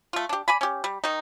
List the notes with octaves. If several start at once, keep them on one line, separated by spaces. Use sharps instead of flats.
A3 F4
D4 G4
D5 G#5 B5
C#4 G4
G3
D#3 D#4